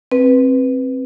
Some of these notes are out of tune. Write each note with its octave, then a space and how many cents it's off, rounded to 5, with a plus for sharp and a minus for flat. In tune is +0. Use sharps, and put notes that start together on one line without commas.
C4 +20 B4 +0